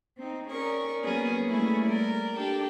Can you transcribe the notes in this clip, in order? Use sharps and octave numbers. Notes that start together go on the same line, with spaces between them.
C4 D#4
C#4 G#4 A#4 D5 C#6
F#3 A#3 B3 C#4 G#4 B4
G3 A3 A#3 C#4 E4 G#4
A#4 D5
D4 G4 A4 G5